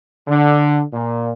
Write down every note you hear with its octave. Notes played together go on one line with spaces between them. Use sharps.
D3
A#2